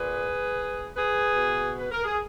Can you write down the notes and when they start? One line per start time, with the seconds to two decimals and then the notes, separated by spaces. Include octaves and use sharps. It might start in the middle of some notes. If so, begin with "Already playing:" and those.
Already playing: A#2 G#4 B4
0.95 G#4 B4
1.36 B2
1.78 B4
1.92 A#4
2.04 G#4